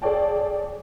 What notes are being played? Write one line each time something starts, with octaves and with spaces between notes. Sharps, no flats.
G#4 A4 C#5 D5 G5 A5